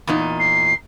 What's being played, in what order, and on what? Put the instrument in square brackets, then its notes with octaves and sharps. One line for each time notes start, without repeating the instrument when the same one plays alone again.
[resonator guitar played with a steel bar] E2 A#2 D#4
[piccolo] C7